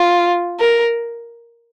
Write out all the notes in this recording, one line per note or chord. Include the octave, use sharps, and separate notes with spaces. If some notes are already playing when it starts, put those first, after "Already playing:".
Already playing: F4
A#4